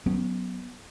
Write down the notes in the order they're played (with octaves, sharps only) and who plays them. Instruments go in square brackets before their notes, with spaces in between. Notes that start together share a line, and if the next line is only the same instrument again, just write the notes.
[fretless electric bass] F#3 B3 C#4